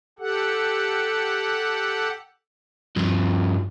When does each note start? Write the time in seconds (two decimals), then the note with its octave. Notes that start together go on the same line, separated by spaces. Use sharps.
0.19 G4 A4 F#5
2.96 G2 F3